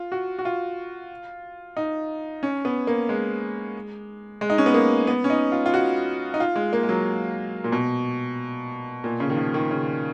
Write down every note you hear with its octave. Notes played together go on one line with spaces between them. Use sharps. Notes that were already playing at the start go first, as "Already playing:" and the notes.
Already playing: F4
F#4
F#4
F4
D#4
C#4
B3
A#3
G#3
G#3
D#4
C#4
B3
A#3
B3
C#4
D#4
F4
F4
F#4
D#4
F4
G#3
A#3
G#3
F#3
A#2
B2
A#2
C#3
D#3
F3
D#3
C#3